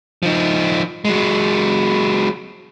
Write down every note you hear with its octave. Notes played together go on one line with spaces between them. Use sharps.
F3 D#4
F#3 G#3